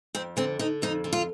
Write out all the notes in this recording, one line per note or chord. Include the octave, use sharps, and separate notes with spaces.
F2 C4
D3 C4
D3 D#4
F2 D#4
D3
F4